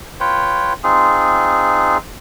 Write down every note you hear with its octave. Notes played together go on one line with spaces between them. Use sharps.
F4 B4 C#5 G5
C4 D#4 F4 G#4